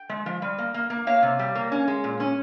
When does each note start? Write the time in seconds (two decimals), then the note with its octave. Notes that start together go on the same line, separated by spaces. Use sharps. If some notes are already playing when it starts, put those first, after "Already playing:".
Already playing: G5
0.09 G#3
0.26 F3
0.42 G3
0.58 A#3
0.74 A#3
0.90 A#3
1.07 A#3 C#5 F5
1.22 C3
1.39 G3
1.55 A#3
1.72 C#4
1.88 G#3
2.04 A#2
2.20 C#4